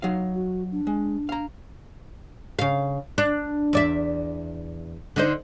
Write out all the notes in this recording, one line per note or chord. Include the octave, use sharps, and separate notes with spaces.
F#3 D#4 F5
F#4
D4
G#3
F5 A#5
C#3 F5
D4
E2 D5 E5
D3 D#4 C5